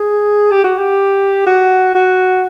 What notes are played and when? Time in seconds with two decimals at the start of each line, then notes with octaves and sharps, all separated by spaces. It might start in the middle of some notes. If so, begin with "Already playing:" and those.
Already playing: G#4
0.51 G4
0.64 F#4
0.78 G4
1.46 F#4
1.95 F#4